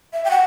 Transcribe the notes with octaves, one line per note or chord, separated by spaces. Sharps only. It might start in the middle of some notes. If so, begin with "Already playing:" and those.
E5
G5
F#5